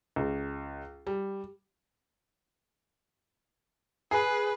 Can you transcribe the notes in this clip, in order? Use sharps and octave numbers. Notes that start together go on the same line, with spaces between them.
C#2
G3
G#4 B4